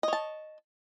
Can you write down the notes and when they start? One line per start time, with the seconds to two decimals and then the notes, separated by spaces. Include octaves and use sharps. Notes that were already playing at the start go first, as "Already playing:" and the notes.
0.03 D#5
0.08 C#5
0.13 A5